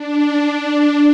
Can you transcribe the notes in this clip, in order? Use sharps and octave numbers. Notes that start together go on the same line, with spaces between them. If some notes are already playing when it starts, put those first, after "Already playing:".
Already playing: D4